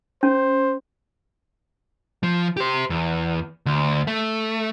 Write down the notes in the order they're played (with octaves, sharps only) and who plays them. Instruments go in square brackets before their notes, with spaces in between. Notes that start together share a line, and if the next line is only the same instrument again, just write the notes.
[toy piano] C#4 [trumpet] C5
[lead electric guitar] F3
G4 C5
E2
D2
A3